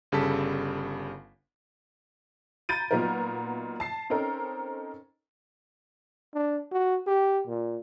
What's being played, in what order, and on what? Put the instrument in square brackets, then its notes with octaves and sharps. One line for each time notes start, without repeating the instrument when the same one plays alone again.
[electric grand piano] G1 C#3 G3 A4 A5 B6
[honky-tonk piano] A#5 B5 G6 A6 D7 D#7
A#2 F#3 B3 D#4 F4 A#4
A5 C7
C4 C#4 D#4 A4 A#4 C5
[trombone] D4
F#4
G4
A#2